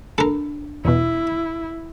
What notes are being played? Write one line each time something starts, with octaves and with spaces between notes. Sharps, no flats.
D4 A4 A#4
E2 B2 E4